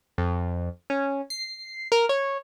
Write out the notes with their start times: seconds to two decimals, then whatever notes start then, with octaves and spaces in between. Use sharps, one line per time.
0.18 F2
0.90 C#4
1.30 C7
1.92 A#4
2.09 C#5